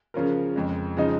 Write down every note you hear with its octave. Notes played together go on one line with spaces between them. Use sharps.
C#3 F3 C#4 F4 A#4
F2 C#3 G#3
C#3 F3 G#3 D#4